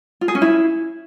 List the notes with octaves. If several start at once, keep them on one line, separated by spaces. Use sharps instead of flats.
F4
G#4
C#4
E4